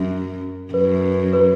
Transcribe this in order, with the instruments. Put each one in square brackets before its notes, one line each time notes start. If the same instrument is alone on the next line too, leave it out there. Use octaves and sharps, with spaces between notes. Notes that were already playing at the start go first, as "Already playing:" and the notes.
Already playing: [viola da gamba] F#2
[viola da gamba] F#2 [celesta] B4
[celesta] B4